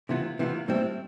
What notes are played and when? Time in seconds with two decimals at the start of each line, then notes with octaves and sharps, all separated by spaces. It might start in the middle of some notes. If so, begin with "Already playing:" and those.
0.09 C3 E3 B3 F4
0.39 C3 E3 B3 F4
0.68 A2 G3 C4 E4